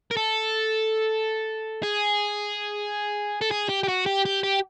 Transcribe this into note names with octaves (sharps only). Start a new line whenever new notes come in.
A#4
A4
G#4
A4
G#4
G4
G4
F#4
G4
G4
G4